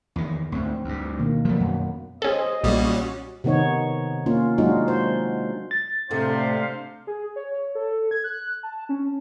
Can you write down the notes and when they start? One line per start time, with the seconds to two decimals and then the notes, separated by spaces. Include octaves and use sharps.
0.16 E2 D#3
0.52 D2 G#2 C4
0.84 D2 G2
1.19 B2 D#3 A#3
1.45 F3 F#3 A3 B3
1.60 F#2
2.22 C#4 G#4 A4 C5 D#5
2.64 B1 A#2 G3 C#4 F#4
3.44 C3 D#3 B3 D#4 C#5
4.26 A#3 C#4 F4
4.58 F#3 G#3 D4 D#4 F4 F#4
4.88 C5
5.71 A6
6.11 A2 C3 A3 D4 C5 D#5 F5
7.07 G#4
7.36 C#5
7.75 A4
8.11 G#6
8.24 F#6
8.63 A5
8.89 C#4